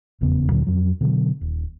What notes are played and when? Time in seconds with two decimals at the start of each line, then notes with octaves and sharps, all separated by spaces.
0.21 F1 E2 C#3 B3
0.49 D2 A#2 D3 F#3
0.67 F2 F#3
1.01 B2 D3 E3 F#3
1.41 D#1